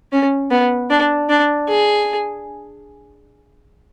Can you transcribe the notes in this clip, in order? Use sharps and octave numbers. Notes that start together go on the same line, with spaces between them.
C#4
B3
D4
D4
G#4